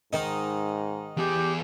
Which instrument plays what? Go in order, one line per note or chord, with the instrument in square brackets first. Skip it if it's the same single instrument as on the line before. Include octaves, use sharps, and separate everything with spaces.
[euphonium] G#2 [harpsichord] D#3 D#4
[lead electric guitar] E2 G#4 [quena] G4